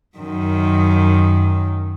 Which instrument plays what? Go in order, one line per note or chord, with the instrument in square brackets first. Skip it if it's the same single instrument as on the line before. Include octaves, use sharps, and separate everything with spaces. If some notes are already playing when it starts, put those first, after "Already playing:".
[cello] F#2 D#3